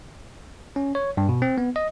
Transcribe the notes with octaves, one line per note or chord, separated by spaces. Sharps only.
C#4
C#5
G2
B2
C4
B3
D#5